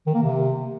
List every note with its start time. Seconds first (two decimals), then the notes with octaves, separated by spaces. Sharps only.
0.07 D#3
0.15 A#3
0.23 C3